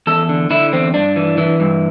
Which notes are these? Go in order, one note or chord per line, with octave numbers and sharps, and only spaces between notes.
E2 A4
D3
D3 E4
E2 C4
G2 D4
E3
E3
G2